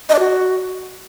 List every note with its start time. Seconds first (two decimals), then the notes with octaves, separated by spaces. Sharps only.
0.09 D#5
0.14 D5
0.19 F#4